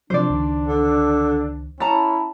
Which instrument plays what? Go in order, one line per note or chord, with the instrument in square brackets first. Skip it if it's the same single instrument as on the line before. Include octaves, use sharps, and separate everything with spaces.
[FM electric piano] C3 F3 F#3 [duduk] D4 [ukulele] C5 D5
[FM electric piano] C#2 D#3
[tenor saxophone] D3
[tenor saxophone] C#4 [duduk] E4 [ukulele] A5 A#5